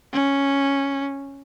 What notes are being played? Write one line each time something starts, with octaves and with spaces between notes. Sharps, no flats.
C#4